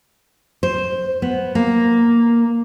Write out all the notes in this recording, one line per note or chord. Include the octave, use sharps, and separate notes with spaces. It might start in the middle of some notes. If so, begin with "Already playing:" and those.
C5
B3
A#3